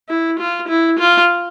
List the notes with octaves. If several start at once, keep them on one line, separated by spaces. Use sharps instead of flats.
E4
F4
E4
F4